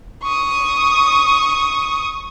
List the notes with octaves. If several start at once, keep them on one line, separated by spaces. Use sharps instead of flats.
C#6 D#6